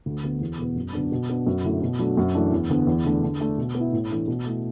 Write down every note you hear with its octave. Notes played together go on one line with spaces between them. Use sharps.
D2
D3 B3
E2
B2 B3
F#2
D3 F#3 B3 D4
B2
B3 D4
F#2
D3 A3 E4
B2
F#3 A3 D4
F#2
E3 A3 D4
E2
D3 B3
E2
D3 A3 D4
D3
A3 D4
B2
B3
E4
A2
E3 A3 D4
B2
A3 E4